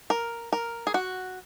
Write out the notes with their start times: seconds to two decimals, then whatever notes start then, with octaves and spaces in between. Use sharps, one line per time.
0.10 A#4
0.52 A#4
0.87 G#4
0.94 F#4